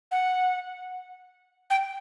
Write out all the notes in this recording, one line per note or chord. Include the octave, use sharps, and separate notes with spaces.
F#5
G5